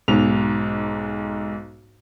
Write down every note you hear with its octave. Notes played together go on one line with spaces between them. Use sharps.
B1 G#2 F7